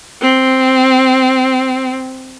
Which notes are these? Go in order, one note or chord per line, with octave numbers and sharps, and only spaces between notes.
C4